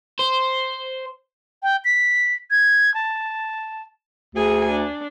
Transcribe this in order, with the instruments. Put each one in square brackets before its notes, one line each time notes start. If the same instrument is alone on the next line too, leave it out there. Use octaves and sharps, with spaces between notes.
[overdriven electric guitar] C5
[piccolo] G5
B6
G#6
A5
[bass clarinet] D2 [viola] G#4 G#5
[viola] D4